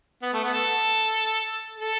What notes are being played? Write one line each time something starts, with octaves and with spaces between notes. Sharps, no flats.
B3
A3
B3
A4
A4